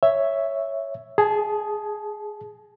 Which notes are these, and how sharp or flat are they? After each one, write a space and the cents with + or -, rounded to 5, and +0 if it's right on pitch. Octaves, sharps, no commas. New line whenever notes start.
C#5 +0 E5 +0
G#4 +0 A5 -25